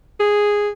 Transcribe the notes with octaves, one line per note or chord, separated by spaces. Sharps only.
G#4